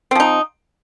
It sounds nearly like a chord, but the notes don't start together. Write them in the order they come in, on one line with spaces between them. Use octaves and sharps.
C4 F3 D#4